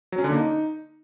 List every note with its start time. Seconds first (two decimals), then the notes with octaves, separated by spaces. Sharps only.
0.12 F#3
0.18 C#4
0.24 D3
0.30 A#3
0.36 D#4